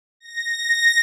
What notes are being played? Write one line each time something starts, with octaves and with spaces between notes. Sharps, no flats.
A#6